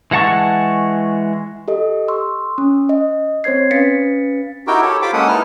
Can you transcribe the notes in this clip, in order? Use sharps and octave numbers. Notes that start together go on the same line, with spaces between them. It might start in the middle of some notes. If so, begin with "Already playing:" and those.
E3 G#3 F#5 A5 C#6
G4 A4 D#5
C6 C#6 E6
C#4
D#5
C4 C5 C#5 G#6 C7
C#4 B4 F5 A6 B6 C#7
D#4 E4 F#4 G4 A#4 G5
G4 A4 C#5
F4 G4 C5 G5 B5 D6
G#3 A#3 C#4 A4 F#5 D#6
D#4 E4 A4 B4 F6